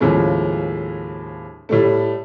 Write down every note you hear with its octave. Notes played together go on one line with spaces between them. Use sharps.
D#2 A2 C#3 F3 G#3
A2 G3 A3